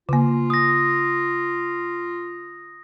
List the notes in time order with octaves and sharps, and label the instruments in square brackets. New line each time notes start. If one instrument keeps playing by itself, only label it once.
[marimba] C#3 A#3 [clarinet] F4
[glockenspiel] D#6 A#6